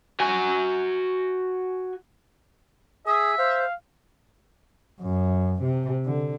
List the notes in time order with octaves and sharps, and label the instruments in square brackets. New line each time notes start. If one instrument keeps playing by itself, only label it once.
[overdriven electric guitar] F#4 G#5
[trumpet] G#4 [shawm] E5 [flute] D#6
[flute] C5 [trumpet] F5
[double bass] F#2
C3
D3